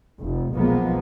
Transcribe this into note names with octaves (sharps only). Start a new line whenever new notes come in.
F1
B1 F3 G#3 A#3 B3